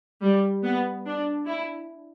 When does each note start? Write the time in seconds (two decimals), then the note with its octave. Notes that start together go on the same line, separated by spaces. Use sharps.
0.22 G3
0.64 B3
1.06 D4
1.47 E4